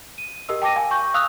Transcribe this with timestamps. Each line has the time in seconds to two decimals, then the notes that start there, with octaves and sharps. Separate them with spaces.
0.18 D#7
0.49 G4 A#4 D#5 E6
0.62 G5 A5 D6 A#6 D#7
0.76 F5 G#5
0.91 C#6 G6
1.14 F5 D#6 E6 F#6 F7